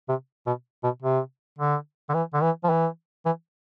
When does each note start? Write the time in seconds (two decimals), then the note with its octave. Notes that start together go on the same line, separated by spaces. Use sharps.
0.09 C3
0.47 B2
0.84 B2
1.02 C3
1.58 D3
2.09 D3
2.14 E3
2.34 D3
2.42 E3
2.64 F3
2.70 E3
3.25 E3